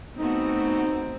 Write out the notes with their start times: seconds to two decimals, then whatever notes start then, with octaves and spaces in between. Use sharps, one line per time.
0.18 A3 B3 C4 D#4 F#4